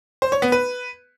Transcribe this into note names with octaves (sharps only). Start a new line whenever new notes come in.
C5
C#5
B3
B4